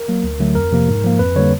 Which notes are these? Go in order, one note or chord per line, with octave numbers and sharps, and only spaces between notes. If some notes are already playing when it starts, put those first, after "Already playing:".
Already playing: A#4
F#3 A#3
D2
D3 F#3 A3
F2 A#4
C3 F3 A#3
G#2
F3 A#3
F2 B4
D3 G3 A#3 C#5